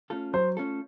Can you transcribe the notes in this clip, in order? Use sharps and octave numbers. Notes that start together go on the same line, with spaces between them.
A3 C#4 F4 A4
F#3 C5
A3 C#4 F4 A4